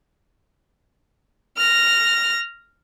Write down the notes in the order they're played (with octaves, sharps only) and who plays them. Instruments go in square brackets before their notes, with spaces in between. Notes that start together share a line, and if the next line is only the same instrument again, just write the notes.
[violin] F6 A#6